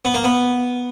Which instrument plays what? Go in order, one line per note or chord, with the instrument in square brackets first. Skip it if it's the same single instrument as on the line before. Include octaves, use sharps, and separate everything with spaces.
[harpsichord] B3
A#3
B3